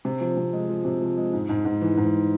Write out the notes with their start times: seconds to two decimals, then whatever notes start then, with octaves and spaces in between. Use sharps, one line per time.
0.05 C3
0.21 F3
0.37 C3
0.53 G#3
0.69 F3
0.85 C3
1.01 F3
1.17 G#3
1.33 G#2
1.49 G#2
1.65 G#2
1.81 E3
1.97 G#2